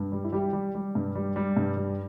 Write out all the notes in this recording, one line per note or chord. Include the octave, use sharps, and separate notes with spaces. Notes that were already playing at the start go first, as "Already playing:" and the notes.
Already playing: G2
G3
E4
G3 G4
G3
G3
G2
G3
G3
G2
G3